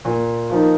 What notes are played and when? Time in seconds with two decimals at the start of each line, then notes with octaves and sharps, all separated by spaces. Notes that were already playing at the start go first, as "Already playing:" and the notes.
0.05 A#2
0.50 F3 A#3 D#4